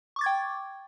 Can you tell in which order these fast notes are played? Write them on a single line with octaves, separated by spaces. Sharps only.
C#6 D6 A6 G#6 G5